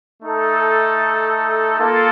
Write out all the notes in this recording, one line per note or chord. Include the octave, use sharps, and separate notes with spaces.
A3 D#4 A4
A#3 F4 A4